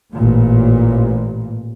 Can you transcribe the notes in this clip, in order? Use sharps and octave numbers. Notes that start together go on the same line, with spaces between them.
A1 A#2